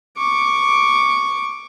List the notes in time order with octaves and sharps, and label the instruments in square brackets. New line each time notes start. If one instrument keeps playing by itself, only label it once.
[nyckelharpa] C#6 D6